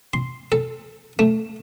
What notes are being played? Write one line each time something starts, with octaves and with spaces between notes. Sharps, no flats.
C6
A4
A3